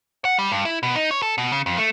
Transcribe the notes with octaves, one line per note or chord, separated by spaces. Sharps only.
F#5
G3
G2
E4
B2
D#4
C#5
A4
B2
C#3
F2
A3